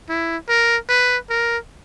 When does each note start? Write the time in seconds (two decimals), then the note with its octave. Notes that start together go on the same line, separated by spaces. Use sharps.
0.09 E4
0.49 A#4
0.89 B4
1.30 A#4